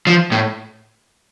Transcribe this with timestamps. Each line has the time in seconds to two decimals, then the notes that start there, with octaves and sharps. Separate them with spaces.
0.07 F3
0.32 A2